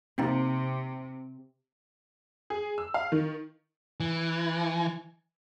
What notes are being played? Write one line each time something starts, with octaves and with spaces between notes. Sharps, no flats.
C3 A#3 C4 D#4
G#4
E6
F5
D#3
E3